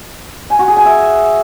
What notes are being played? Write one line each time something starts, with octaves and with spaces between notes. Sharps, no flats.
G#5
F#4
G#4
G#5
E5